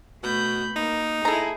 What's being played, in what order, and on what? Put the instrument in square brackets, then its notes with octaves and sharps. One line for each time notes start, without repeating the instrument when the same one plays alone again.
[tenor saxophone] B2 [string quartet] A3 B5 G6
[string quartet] A#3 [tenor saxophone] D#4
[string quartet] E4 G#4 [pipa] A4 A#5